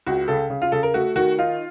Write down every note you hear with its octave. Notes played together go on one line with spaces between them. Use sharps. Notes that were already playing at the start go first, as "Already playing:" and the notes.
C#2 F#4
C#3 A4
C#3
F4
C#3 A4
A#4
A3 F#4
D#3 F#4
D#4 F4